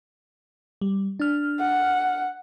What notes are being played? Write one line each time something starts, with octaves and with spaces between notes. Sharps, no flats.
G3
D4 F6
F#5